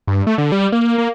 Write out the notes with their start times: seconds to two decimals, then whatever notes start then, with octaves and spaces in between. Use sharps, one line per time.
0.08 G2
0.27 A3
0.38 D3
0.52 G3
0.72 A#3
0.98 A#3